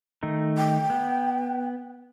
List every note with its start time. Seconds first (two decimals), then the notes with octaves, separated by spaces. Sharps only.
0.23 D#3 A3 D#4
0.57 G5
0.90 B3